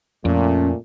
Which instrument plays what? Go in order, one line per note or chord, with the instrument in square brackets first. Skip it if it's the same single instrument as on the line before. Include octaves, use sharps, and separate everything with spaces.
[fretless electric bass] F2 [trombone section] A#2 A3 [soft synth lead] C#4